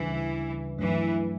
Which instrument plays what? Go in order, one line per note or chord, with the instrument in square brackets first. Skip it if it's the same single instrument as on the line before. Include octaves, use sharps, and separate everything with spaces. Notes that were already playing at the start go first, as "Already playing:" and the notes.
Already playing: [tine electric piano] D2 C#3 G3 D4 [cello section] E3
[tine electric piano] G2 F#3 A3 D4 [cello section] E3